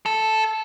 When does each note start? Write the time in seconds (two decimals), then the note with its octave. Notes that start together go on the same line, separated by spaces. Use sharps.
0.06 A4